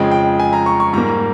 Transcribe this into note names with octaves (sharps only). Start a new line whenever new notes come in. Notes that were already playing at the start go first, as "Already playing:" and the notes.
Already playing: F2 C#3 F3 G#3 G5
G5
G#5
A#5
C#6
C#6
G#2 G3 A#3 A#5